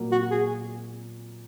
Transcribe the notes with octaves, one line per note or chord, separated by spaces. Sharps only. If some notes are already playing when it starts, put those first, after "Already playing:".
Already playing: A#2 F#3 A#3
F#4
G#4